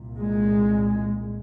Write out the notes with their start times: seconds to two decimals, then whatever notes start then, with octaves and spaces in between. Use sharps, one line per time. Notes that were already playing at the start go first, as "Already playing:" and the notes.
Already playing: C2 A#2
0.20 G#3